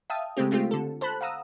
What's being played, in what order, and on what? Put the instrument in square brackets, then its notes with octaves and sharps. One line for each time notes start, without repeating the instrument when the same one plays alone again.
[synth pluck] E5 F5 G5 A5 D#6
C#3 G#3 A3 C4 G4
G#3 A3 C4 F4 G4
D3 A4
A4 C5 A5 B5 F#6
F5 F#5 A#5 D#6 E6